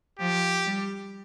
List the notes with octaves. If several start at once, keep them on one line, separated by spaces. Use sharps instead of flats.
F3 G4
G3